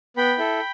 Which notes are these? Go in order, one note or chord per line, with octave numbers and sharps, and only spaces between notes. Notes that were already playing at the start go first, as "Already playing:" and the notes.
B3 G5 B5
E4 A4